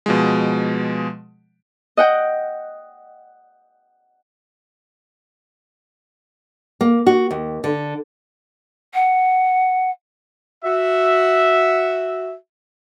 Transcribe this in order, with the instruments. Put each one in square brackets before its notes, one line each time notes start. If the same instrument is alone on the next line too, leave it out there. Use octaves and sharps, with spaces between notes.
[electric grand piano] B2 F3 G#3
[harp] D#5 F#5 G5
[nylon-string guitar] A#3
F#4
D#2
D3
[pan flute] F#5
[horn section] F#4 E5